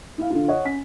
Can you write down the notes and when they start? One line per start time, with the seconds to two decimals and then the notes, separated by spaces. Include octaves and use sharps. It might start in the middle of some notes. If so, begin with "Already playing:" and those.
0.18 E4 F5
0.30 D3 F4
0.48 C#5 D#5 F#5
0.65 C#4 B6